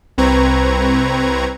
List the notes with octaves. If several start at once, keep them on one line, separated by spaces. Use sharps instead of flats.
C2 C4 B4 A#5 C#6 G#6